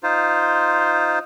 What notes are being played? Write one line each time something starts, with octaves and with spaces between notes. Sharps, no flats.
D#4 F4 C5